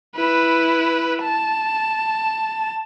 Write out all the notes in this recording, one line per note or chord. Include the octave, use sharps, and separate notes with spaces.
E4 B4
A5